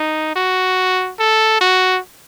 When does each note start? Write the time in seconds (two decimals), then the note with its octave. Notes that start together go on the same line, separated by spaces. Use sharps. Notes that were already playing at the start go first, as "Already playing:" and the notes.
Already playing: D#4
0.36 F#4
1.19 A4
1.61 F#4